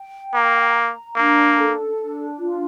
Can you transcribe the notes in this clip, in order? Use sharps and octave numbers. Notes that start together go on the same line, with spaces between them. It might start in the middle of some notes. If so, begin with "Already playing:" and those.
Already playing: G5
A#3 A#5
A#5
A#3 D4
A4
D4
F4